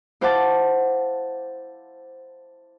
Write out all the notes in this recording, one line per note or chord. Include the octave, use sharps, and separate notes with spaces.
E4 C5 F5 F#5 A5 D6